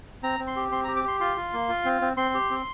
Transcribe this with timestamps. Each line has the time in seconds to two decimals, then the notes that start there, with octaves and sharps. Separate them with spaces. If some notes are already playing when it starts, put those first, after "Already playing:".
0.23 C4 A#5
0.40 C4
0.47 C6
0.56 G4
0.71 C4 C6
0.84 A#5
0.88 G4
0.96 D6
1.04 G4 C6
1.20 F4 C6
1.37 F4
1.53 A#3
1.69 F4
1.85 C4
2.02 C4
2.17 C4 C6
2.34 G4
2.50 C4